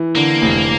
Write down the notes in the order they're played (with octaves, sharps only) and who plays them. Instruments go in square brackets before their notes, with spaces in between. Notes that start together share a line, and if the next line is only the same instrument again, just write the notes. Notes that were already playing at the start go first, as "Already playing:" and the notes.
Already playing: [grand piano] E3
[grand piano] D3 [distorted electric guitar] A#3
[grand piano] F1